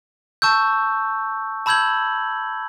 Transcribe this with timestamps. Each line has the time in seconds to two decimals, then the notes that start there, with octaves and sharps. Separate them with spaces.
0.42 A5 C#6 E6 G6
1.66 A5 B5 E6 G6 G#6 F#7